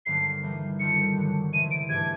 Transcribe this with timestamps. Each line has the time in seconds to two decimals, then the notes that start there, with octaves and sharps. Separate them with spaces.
0.06 G2 D3 F#3 A#3 D#4 C7
0.43 E3 G3 A#3 D#4
0.79 D#3 G3 C4 F4 A4 C#7
1.17 G2 D3 F#3
1.52 C3 E3 G#3 D#7
1.71 D7
1.89 G#2 E3 A3 D4 G4 G#6